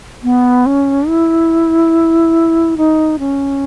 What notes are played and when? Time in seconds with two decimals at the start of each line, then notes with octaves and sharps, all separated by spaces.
0.23 B3
0.66 C#4
1.08 E4
2.77 D#4
3.19 C#4